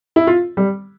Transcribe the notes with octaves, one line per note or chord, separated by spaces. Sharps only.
E4
F4
G3